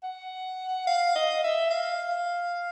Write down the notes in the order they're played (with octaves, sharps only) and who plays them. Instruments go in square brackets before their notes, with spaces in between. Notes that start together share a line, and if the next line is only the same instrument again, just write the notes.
[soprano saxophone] F#5
F5
D#5
E5
F5